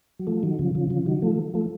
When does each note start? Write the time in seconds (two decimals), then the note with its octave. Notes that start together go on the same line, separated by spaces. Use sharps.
0.19 F#3
0.27 F3 A3
0.43 D#3 F#3
0.59 C#3 F3
0.75 C#3 F3
0.90 C#3 F3
1.06 D#3 F#3
1.22 F3 A3
1.54 F3 A3